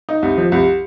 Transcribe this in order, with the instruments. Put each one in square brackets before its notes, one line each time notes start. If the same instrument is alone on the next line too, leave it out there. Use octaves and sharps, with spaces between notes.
[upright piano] D#4
C2
F3
C2